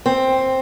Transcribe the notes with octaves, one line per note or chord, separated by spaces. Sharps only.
C4